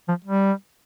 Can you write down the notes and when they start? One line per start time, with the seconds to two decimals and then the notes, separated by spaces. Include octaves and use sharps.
0.09 F3
0.25 G3